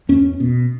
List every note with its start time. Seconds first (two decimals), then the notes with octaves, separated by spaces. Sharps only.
0.09 E2 C#4
0.40 B2